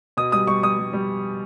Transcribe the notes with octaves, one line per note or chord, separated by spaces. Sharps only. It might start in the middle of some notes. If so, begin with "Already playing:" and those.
B2 D#6
G3 D#6
G3 C#6
G3 D#6
G3
G3